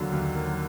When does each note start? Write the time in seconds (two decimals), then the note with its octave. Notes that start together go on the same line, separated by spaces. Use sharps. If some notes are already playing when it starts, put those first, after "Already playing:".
Already playing: D#2 D3 F#3
0.12 D#2
0.35 F#3 A#4